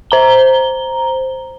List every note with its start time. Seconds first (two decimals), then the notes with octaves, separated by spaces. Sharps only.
0.11 C5 A#5 G7